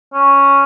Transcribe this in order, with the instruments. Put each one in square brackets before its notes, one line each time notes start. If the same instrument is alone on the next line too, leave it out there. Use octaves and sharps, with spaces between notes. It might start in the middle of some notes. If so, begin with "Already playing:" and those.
[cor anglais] C#4